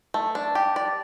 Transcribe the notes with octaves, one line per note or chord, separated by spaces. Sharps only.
A3
D4
G4
D5